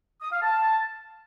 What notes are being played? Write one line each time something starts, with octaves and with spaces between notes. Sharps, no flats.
D#6
F5
A5